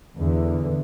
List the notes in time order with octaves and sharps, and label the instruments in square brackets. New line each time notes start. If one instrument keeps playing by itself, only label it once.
[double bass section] E2 D3 E3